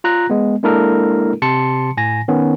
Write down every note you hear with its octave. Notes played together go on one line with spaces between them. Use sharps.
F4 A#5 F#6 A#6
G#3 B3
G#3 A#3 D4 E4 A4 A#4
C3 A5 C6 C#7
A2 G#5 A#6
D#3 B3 C#4